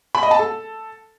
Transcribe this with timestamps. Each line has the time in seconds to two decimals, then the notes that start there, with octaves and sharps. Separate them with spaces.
0.15 B5
0.23 D#5
0.31 A5
0.39 A4